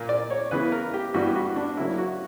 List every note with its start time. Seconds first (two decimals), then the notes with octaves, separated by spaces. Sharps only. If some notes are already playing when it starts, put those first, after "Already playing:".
Already playing: A#2 A#3
0.09 D5
0.30 C#5
0.51 C#3 E3 B3 B4
0.72 A#4
0.94 G4
1.14 G2 E3 G3 B3 F#4
1.36 F#4
1.56 D4
1.77 C#3 F#3 A#3 E4
1.98 F#4